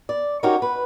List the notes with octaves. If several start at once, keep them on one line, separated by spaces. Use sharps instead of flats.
D5
C#4 D#4 F#4 G4 A#4 C#5
B4